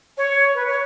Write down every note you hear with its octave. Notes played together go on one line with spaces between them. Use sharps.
C#5
B4
C#5